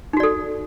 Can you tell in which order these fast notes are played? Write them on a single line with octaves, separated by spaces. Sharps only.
D#4 F#4 D5 A4